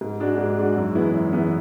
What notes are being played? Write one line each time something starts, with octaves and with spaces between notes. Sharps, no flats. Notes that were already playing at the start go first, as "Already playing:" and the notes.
G#2
G#3 D4 F#4
G#2
G#3 D4 F#4
F#2
E3 G#3 B3 E4
F#2
E3 G#3 B3 E4